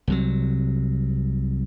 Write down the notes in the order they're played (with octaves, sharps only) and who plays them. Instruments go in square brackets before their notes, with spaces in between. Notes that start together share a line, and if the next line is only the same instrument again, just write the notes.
[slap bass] C2 C3 F#3